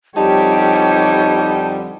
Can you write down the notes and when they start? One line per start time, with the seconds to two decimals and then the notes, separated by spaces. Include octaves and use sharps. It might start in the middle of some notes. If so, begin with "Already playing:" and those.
0.16 F2 D3 G3 D#4 G4 C#5 A5